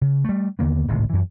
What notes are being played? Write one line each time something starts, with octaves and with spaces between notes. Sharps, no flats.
C#3
G3 A3
D#2 D3 A#3 B3
D1 G#1 C#2 A2
F#2 E3